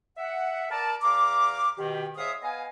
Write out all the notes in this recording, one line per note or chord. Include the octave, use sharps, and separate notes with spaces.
E5 F#5
A#4 D5 A5
E2 F5 A#5 D6
B2 D#3 G4
G#2 C#5 E5 F5 D#6
B3 D#5 F5 G#5